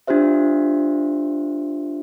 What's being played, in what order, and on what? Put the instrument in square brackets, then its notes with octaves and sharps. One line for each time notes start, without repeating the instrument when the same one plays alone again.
[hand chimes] D4 F4 G4 C5 E5